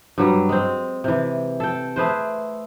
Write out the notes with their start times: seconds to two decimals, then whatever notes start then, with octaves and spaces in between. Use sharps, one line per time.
0.18 G2 F#3 G3
0.49 G#3 C4
1.04 C3 E3
1.60 A4 G5
1.96 A3 G#4 B4 C5